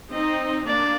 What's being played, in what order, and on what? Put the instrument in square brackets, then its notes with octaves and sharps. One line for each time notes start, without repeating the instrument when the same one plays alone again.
[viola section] C4 D#4 [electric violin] D#5
[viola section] A#3 D4 [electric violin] D5